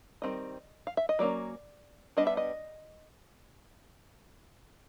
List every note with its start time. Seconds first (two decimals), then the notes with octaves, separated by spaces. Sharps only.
0.22 D#3 G3 C4 D#5
0.87 F5
0.97 E5
1.09 D#5
1.19 F#3 A#3 C#4 D5
2.17 G3 B3 D4 D#5
2.27 E5
2.37 D#5